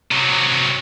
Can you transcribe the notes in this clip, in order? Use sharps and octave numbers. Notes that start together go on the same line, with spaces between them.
C3 F#3